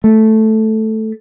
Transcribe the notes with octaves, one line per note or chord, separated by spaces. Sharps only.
A3